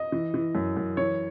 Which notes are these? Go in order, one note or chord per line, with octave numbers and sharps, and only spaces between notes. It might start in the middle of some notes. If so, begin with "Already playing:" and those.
Already playing: D#5
E3
E3
F#2
F#2
E3 C#5